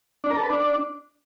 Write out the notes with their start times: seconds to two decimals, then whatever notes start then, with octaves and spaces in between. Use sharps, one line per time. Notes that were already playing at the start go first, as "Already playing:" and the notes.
0.24 D4
0.30 A#4
0.37 A4
0.43 B4
0.50 D4